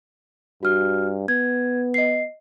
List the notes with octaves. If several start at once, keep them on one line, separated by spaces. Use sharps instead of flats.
G2 F#4 F6
B3 G#6
D#5 C7